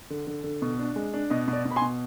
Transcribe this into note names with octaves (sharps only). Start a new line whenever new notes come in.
D3
D3
D3
B2
D4
G#3
D4
B2 D#5
B2
D5
B2
B5
G#5 C6
B2